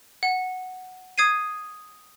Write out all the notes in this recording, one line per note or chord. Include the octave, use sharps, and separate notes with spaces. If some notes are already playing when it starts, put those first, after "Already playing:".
F#5
D#6 G#6 C7 D#7